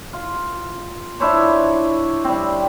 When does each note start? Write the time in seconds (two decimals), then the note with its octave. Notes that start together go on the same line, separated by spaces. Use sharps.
0.13 F4
1.20 D4 E4 C5 C#5
2.25 G3 C4